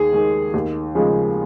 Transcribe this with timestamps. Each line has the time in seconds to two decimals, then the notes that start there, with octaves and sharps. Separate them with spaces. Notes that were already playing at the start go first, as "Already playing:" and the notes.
Already playing: D#2 G#4
0.13 D#3 G#3
0.54 D#2
0.95 C#3 F3 G#3